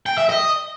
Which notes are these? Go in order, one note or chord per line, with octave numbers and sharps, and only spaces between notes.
G5
E5
D#5